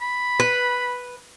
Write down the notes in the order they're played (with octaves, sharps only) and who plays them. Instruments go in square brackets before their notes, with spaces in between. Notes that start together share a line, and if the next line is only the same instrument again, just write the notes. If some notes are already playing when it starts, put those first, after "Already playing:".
[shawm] B5
[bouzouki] B4